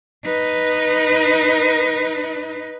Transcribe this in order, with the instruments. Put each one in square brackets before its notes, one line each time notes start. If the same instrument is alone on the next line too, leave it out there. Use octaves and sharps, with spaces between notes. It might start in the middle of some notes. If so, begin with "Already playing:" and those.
[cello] D#4 B4